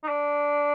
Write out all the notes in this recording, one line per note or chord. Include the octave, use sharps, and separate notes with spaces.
D#4
D4